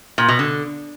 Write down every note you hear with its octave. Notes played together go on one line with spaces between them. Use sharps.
A#2
B2
D3